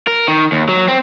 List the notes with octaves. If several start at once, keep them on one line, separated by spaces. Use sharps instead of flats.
A#4
D#3
D#2
F#3
C4